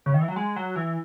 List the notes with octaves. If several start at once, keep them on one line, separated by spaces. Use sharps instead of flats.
C#3
D#3
E3
F#3
G#3
F#3
E3